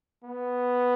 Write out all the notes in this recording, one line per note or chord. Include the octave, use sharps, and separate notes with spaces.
B3